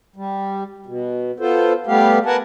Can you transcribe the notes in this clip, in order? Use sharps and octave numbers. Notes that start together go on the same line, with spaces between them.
G3
B2
B3 F4 A4 C5
G3 A3 B3 G4 F5
A#4 B4 F#5 G#5 A5